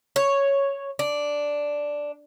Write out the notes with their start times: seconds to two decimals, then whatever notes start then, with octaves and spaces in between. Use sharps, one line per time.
0.16 C#5
0.99 D4